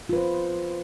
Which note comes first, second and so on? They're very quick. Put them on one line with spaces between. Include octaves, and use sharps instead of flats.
F4 B4 C5